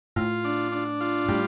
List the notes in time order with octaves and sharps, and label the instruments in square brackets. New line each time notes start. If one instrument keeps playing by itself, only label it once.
[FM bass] A2 [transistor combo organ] F4
[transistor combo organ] D4
D4
F4
[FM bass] A2 [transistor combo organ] G3